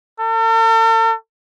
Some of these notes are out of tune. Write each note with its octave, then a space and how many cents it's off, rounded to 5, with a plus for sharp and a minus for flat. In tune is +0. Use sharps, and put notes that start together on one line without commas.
A4 +45